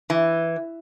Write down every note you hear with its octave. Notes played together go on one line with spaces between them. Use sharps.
E3